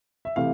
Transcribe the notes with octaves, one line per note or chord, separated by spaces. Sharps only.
E5
C3 E3 A3 F5